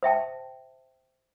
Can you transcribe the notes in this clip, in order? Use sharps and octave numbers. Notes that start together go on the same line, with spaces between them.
C5 E5 G5 A5